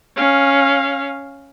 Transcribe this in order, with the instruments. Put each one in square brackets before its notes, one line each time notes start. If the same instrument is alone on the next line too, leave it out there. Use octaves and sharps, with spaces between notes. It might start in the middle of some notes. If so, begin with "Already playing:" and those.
[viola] C#4 F5